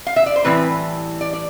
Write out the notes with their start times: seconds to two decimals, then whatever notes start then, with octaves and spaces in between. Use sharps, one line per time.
0.07 F5
0.16 E5
0.26 D5
0.36 C5
0.45 A2 E3 G3 C4 B4
1.21 D5
1.33 D5